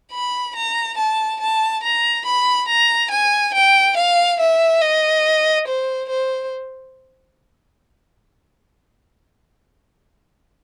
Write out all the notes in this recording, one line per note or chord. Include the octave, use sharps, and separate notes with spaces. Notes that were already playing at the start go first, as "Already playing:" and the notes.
B5
A#5
A5
A5
A#5
B5
A#5
G#5
G5
F5
E5
D#5
C5
C5